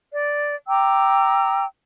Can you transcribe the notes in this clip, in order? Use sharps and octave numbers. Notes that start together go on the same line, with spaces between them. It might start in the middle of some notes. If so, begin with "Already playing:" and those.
D5
G5 A#5 D6 E6